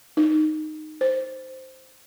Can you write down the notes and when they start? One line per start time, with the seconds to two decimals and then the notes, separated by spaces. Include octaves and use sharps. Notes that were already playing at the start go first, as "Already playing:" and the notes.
0.17 D#4
1.01 C5